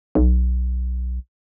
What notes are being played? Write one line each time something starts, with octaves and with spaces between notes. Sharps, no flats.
B1